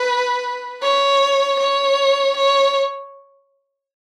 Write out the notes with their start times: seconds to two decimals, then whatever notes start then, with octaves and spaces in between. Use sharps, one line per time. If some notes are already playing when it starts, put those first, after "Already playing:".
Already playing: B4
0.83 C#5
1.60 C#5
2.37 C#5